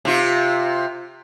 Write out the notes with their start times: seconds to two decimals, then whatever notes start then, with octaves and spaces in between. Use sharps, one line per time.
0.05 C3 F4